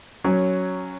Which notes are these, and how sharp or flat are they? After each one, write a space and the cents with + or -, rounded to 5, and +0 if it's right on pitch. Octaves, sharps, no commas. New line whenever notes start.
F#3 +0 C#4 +0